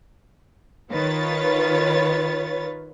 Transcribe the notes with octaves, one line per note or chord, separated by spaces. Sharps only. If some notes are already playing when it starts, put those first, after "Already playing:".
D#3 F4 B4 C#5 A6